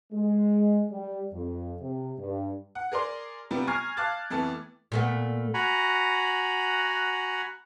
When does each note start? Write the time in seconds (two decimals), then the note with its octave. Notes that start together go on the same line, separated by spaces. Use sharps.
0.12 G#3
0.91 G3
1.33 F2
1.80 C3
2.19 G2
2.75 F#5
2.92 G#4 A#4 D5 C6
3.51 C3 F3 G3 B3
3.67 G#5 A#5 C#6 F6 G#6 C7
3.97 F5 A5 D6 F#6 A6
4.30 F2 E3 A3 B3 A5
4.92 A#2 A3 B3
5.54 F#4 F#5 G#5 A#5 B5